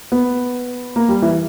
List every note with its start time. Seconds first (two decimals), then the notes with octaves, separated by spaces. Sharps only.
0.12 B3
0.96 A#3
1.09 G3
1.22 E3